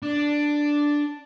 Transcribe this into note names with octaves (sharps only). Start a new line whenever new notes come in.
D4